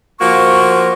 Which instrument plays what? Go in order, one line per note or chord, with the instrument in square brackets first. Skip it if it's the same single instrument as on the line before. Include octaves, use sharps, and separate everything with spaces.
[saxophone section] F3 A#3 F#4 [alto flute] C#6